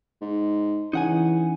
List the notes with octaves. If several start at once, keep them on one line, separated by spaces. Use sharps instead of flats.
G#2
C#3 E3 D#4 F#5 G#5